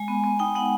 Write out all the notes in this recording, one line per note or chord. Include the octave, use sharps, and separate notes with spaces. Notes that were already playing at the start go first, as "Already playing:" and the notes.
Already playing: G#3 G#5
B3
B3
D#4 G5
B3 F#5